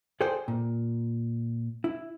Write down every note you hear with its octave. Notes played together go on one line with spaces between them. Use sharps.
G#4 A4 C5 D5 G5
A#2
E4